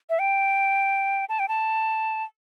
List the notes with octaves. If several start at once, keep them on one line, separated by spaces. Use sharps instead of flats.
E5
G5
A5
G5
A5